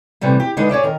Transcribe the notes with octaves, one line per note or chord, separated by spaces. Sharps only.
C3 E3 G3 A3
G4
D3 G#3 B3 D4 D#4
G#4 C#5 D5 E5
D#3 A#4